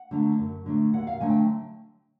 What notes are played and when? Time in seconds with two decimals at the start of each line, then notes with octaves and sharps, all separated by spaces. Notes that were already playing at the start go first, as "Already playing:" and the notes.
Already playing: F#5
0.11 D3 F#3 A3
0.39 F#2
0.66 D3 F#3 A3
0.94 D#2 F#5
1.07 F5
1.20 D3 F#3 A3 G#5
1.30 G5